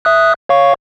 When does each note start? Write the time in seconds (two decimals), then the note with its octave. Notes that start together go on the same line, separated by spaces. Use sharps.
0.05 E5 D#6 F#6
0.49 C#5 F5 C#6